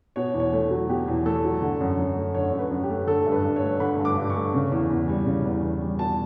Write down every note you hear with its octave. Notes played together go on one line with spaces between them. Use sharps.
B2 C#5
E2
C#5
A3
F#3
B2 G4
E2
A3 A4
F#3
D3
F#2
F#2
A3
D3 C#5
F#2
B4
F#2
G4
A3
D3 A4
G2
B4
G2
C#5
A3
D3 B5
G2
D6
G2
C#6
A3
C#3
E2
E2
G3
C#3
E2
E2
G3
B2 A5